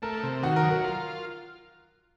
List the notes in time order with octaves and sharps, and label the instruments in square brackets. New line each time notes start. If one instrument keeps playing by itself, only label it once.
[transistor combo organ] A3 [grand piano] A#4
[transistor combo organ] C3
[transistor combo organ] D#3 [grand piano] F#4
[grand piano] A#4
[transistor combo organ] F#3
[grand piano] A#4
[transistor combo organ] F4